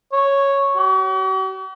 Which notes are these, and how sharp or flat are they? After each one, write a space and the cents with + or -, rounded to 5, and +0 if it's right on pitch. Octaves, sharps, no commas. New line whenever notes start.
C#5 -5
F#4 +45